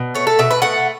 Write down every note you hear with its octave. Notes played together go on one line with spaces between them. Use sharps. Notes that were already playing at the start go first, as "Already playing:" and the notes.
Already playing: B2
A3 C#5
A4
B2 E5
B4
A3 F#5